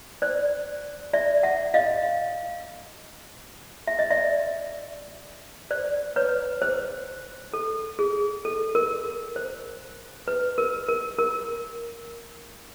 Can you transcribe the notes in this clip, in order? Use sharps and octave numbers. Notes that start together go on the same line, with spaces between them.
C5 D5
D5 E5
E5 F#5
D#5 F5
E5
D#5
D5 E5
C5 D5
B4 C#5
C5
A4
G#4
A4
A#4
C5
B4
A#4
A#4
A#4